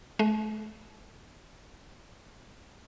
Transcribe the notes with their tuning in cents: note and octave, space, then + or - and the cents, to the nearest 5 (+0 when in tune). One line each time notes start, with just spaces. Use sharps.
A3 -40